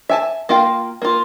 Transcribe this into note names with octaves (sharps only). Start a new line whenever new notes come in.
E5 G#5 A5
A#3 F4 F5 G5
A#3 F4